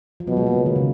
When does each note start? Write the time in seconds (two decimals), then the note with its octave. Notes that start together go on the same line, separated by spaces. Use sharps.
0.20 F3
0.27 B2 F#3
0.37 G#3
0.47 A#3
0.56 C#3
0.66 D#3
0.76 C#3